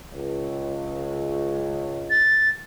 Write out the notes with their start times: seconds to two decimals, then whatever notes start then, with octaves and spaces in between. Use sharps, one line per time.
0.12 C#2
2.10 A6